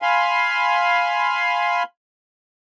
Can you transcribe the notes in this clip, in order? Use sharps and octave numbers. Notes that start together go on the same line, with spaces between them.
F5 G#5 B5 C6